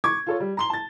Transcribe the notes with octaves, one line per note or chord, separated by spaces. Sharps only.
C#6 D6 G#6
F4 A4 C#5
G3
A#5 C6 G7
A5 A6